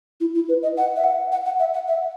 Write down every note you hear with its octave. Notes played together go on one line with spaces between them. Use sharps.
E4
E4
B4
D#5
F#5
E5
F#5
F#5
F#5
E5
F#5
E5